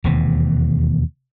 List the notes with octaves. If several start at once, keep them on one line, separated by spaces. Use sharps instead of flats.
E1 D#2 C3